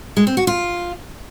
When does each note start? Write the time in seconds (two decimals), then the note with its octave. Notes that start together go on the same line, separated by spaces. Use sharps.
0.17 G#3
0.27 C4
0.37 F#4
0.47 F4